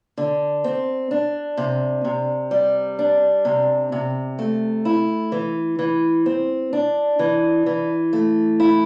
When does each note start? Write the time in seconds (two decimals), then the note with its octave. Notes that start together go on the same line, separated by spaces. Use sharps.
0.18 D3
0.64 C4
1.11 D4
1.57 C3
2.05 C3
2.51 G3
2.99 D4
3.45 C3
3.92 C3
4.39 A3
4.85 E4
5.32 E3
5.79 E3
6.26 C4
6.73 D4
7.19 E3
7.66 E3
8.13 A3
8.60 E4